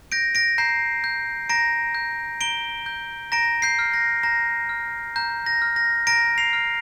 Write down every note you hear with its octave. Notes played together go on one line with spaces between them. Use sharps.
G6 A#6 D7
A#6 D7
A#5 G6 C7
G6
A#5 A#6 D7
G6
A#5 D7 G7
G6
A#5 A#6 D7
G6 C7
F6
A#6
A#5 A#6
F6
A#5 G6
A#6
F6
A#6
A#5 A#6 D7
C7 F7
F6